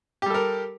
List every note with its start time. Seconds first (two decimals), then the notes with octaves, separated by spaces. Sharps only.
0.22 G4
0.26 G3
0.30 A4
0.34 A#4